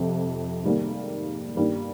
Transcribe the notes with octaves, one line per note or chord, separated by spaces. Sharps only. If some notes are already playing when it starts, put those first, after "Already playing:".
Already playing: F2 C3 F3
G#2 D#3 G3 A#3
G2 D#3 G3 A#3